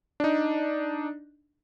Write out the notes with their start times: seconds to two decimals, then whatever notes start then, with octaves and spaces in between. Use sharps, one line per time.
0.20 D4 D#4